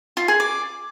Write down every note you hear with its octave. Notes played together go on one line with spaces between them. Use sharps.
F4
G#4
D5